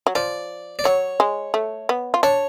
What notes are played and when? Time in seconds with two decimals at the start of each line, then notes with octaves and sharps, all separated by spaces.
0.07 F#3
0.15 F3 D5
0.79 D5
0.84 F#3 C#5
1.20 G#3
1.54 A3
1.89 B3
2.14 F4
2.23 D4 C#5